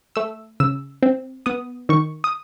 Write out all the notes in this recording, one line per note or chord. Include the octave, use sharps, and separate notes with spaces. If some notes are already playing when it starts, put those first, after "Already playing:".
A3 E6
C#3 E6
C4
B3 D#6
D#3 C#6
D#6